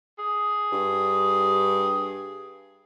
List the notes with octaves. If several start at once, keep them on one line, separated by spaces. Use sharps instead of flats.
G#4
G2